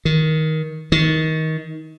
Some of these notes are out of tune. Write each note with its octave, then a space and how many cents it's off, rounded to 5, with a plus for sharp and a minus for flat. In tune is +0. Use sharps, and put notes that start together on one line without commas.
D#3 +15
D#3 +25